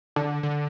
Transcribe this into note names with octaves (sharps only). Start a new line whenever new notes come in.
D3
D3